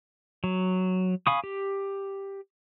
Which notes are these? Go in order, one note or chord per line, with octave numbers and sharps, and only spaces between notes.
F#3
F5 G#5 B5 C#6 D#6
G4